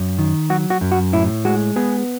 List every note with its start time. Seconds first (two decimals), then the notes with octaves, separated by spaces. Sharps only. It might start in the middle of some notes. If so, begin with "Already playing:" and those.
Already playing: F#2
0.18 D#3
0.50 F#3 F#4
0.70 F#4
0.81 F#2
0.92 F#4
1.13 A2 E4
1.45 G#3 F#4
1.76 B3 G#4